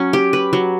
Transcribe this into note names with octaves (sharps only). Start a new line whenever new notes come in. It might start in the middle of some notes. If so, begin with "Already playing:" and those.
Already playing: F#3 C#4
G4
B4
F#3